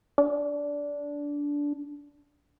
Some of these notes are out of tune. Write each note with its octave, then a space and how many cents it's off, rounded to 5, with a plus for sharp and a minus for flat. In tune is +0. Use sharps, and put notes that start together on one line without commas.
D4 -15